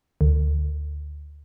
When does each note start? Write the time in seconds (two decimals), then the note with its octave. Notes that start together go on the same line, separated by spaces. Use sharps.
0.21 D2